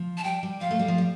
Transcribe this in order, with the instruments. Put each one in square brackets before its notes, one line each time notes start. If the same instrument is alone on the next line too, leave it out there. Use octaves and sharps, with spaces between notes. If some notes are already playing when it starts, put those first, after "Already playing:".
Already playing: [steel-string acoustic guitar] F3
[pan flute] A5
[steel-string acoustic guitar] G3 [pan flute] G5
[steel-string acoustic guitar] G3
[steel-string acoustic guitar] F3 [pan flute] F5
[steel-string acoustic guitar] A3
G3
F3
G3